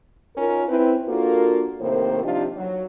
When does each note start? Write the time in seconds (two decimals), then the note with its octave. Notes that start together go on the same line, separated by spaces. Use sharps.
0.36 C#4 D#4 F4 A#4
0.68 C4 E4 B4
1.08 A#3 D4 F4 F#4 A4 A#4
1.80 A2 C3 D#3 A#3 C5
2.23 C3 F3 D4 D#4 F4 G4
2.56 F#3